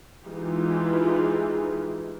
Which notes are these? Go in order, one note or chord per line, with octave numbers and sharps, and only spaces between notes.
E3 G#3 D#4 F4 G4